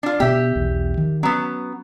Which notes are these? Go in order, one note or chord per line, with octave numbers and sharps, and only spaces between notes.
D4 F4
B2 B3 G4 E5
B1 E2
D#3
F#3 B3 C#4